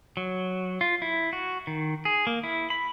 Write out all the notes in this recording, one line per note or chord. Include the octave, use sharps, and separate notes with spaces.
F#3
F4
E4
F#4
D#3
G#4
A#3
E4
B5